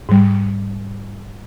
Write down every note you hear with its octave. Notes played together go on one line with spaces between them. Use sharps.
G#2 G3